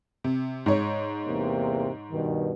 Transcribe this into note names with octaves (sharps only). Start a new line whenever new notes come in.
C3
G#2 C#5
E2 C3 A#3
G2 B2 D#3